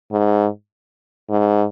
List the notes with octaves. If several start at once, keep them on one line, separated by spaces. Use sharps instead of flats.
G#2
G#2